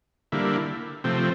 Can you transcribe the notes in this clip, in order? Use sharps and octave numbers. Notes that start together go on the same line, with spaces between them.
D3 G3 A#3 E4
C3 F3 A3 C4